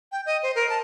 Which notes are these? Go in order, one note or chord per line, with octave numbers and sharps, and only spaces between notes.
G5
D#5
C5
A#4
A5